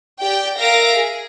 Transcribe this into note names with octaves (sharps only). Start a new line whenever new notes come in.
G4 D5 G5
A#4 E5 F5 A#6 D7
G#4